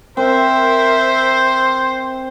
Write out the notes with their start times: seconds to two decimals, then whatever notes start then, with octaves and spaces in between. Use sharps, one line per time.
0.17 C4 A#4 C5 E5